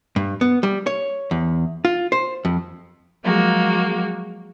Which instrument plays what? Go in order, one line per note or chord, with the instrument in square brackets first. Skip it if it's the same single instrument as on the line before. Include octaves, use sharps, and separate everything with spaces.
[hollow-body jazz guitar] G2
B3
G3
C#5
E2
F4
C5
F2
[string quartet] F3 F#3 G#3 A#3 F#4